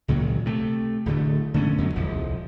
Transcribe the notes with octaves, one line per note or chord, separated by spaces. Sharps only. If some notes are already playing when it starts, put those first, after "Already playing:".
C#2 A#2 D#3 F#3
C3 A3
D1 D3 A3
D3 A3 B3 C#4
F2 D3 F#3
D#1 C2 F3